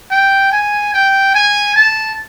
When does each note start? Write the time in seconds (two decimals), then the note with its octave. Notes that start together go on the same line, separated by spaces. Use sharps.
0.11 G5
0.52 G#5
0.94 G5
1.34 G#5
1.76 A5